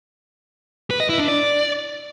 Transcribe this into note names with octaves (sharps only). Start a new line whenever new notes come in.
B4
D#5
E4
D4
D5